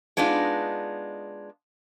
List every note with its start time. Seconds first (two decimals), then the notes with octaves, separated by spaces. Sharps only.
0.17 G#3 B3 D4 D#4 F4